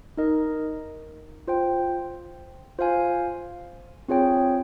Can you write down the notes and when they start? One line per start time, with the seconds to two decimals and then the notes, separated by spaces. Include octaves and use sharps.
0.17 D#4 A#4 D#5
1.48 F4 C5 G5
2.79 F4 C5 F5 G#5
4.08 C4 F4 G#4 C#5 G5